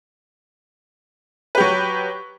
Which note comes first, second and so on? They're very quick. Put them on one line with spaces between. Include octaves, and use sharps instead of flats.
B4 G4 F#3